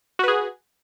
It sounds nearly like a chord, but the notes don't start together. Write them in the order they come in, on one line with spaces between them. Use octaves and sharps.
F#4 B4 G#4